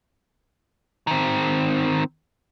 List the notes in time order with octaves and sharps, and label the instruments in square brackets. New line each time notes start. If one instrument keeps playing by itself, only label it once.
[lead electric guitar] D#3 C4